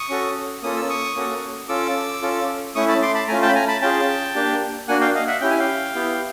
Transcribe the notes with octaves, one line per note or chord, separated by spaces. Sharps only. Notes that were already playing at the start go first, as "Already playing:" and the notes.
Already playing: C#6 D#6
C#4 F#4 A4
A#3 C#4 F4 A4 D#6
E6
C#6 D#6
A#3 C#4 F#4 A4
C#4 F4 A4 D6 E6
C#4 F4 A4
A3 C#4 E4 C#6 D#6
A5 B5
C6 D6
A5 B5
A3 C#4 F4 G#5 A#5
G5 A5
B5
G#5 A#5
A5 B5
C#4 F4 G#4 G5 A5
A#3 D4 G4
A#3 D4 F#4 F#5 G#5
F5 G5
D#5 F5
E5 F#5
C#4 E4 G4 G5
G#5
F5 G5
B3 E4 G4